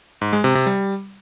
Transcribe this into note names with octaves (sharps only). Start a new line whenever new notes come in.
G#2
G#3
C3
C3
G3